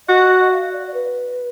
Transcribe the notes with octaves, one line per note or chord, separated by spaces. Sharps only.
F#4 D#5
D#5
F5
D5
D5
B4